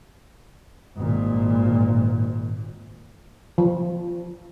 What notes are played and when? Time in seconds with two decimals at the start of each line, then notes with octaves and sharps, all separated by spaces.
0.96 G#1 A#2
3.58 F3